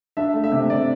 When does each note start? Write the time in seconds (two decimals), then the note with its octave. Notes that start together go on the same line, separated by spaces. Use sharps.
0.17 D4 E5
0.34 A3
0.44 E5
0.52 C3
0.70 C3 D5